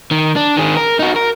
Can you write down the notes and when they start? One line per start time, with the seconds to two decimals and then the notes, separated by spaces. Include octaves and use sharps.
0.11 D#3
0.36 D4
0.57 D#3 G#4
0.77 A#4
0.99 D#4 F#4
1.16 A#4